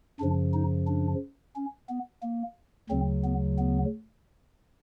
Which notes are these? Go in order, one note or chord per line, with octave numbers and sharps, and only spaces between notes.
F#2 C#3 F3 D4
D#4
D4
C#4
B3
A#3
D2 C#3 F#3 C4
B3
B3